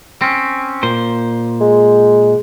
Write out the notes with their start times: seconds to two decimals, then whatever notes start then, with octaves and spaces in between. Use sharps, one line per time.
0.22 C4 C#4
0.83 A#2 C5
1.61 G#3